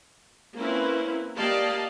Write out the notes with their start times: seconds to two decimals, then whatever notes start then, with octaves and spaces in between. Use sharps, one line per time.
0.58 A#3 C4 C#4 E4 A#4 B4
1.36 A#3 G4 D5 D#5 F5 A5